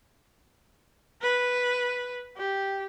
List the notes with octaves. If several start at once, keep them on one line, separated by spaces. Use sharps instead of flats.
B4
G4